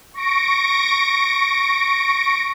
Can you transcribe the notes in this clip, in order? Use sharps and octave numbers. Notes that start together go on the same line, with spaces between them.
C#6 A#6 D7